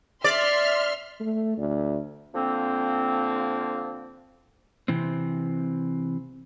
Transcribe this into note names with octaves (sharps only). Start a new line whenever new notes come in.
D5 E5 C6 F6
A3
D2
D3 F3 A#3 C4
C3 E3 C4